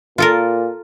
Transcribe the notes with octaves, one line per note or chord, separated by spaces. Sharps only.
A#2 F4 A4 A#4